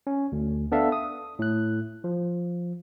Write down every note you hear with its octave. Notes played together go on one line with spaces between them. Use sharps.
C#4
D2
B3 D4 A4 E5 F5
D#6
A2 F#6
F3